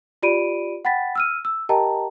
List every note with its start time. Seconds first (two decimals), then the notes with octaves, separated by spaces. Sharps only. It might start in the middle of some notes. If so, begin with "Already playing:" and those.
0.23 F4 G4 D5 B5 D7 D#7
0.85 F#5 G5 B5 A6 B6
1.15 E6 F6 D#7
1.45 E6
1.69 G4 A#4 D#5 G5 A5 A#5